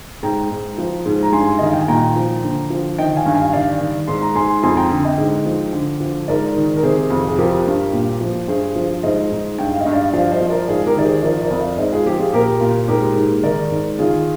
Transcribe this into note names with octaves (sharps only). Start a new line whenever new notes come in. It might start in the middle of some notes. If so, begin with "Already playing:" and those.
G#2 G5 A#5
G#2
F3
G#2
A#5
G2 G#5 C6
D#3 D#5
F5
G5
G#5
A#2 G5 A#5
F3
D3
F3
D#3 D#5 G5
F5 G#5
G2
F5 G#5
D#3 D5 F5
D#3
G#2 C6
A#5
G#2 G#5 C6
F2 G#5 C6
G5 A#5
D3
D#5 G5
G#2
F3
D3
F3
G#2 A#4 D5
D#3
A#4
C3 G#4 C5
F2
G#4
F3 G4 A#4
G2
A#2
F3
G2 G#4 C5
F3
G#2 C5 D#5
G#2
G2 G5
F5
D#5
G2
D5 F5
F3 D5 F5
C5 D#5
F3
A#4 D5
G#2 F4 G#4
G4 A#4
D#3 D5
G#4 C5
F3 A#4 D5
A#4 D5
F2
D5 F5
G#2 C5 D#5
F4 G#4
F3 G4
F4 G#4
A#2 G4 A#4
A#2
G#2 G4 A#4
G#2
D#3 A#4 D5
G#2
D#3 F4 G#4